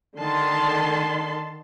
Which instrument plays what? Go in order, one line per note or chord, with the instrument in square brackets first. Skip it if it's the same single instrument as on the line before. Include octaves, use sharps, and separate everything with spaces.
[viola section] D3 D#3 A5 C6